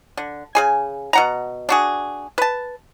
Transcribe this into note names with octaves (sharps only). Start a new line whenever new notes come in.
D3
C#3 G#4 G#5
B2 F#5 A#5
D4 F#4 G#4
B4 A5